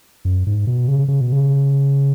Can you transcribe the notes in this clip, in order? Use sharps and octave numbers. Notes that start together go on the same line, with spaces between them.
F#2
G#2
B2
C#3
C#3
B2
C#3